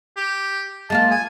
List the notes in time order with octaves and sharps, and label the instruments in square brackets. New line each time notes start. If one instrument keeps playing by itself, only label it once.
[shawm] G4
[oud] G#3 A#3 F4 [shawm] A5
[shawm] G#5